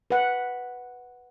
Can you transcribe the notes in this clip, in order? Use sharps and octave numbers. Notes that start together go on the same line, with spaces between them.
B4 F#5